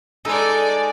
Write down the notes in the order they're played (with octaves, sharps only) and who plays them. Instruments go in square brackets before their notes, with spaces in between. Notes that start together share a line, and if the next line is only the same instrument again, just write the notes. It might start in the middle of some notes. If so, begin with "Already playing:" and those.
[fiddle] G#3 D5 [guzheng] D#4 A4